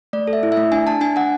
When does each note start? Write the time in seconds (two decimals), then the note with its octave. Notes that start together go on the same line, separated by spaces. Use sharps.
0.13 A3 D5
0.27 A4
0.33 E5
0.43 E4
0.52 E5
0.57 A3
0.72 D4 G#5
0.87 D4 A5
1.01 D4 G#5
1.16 D4 F#5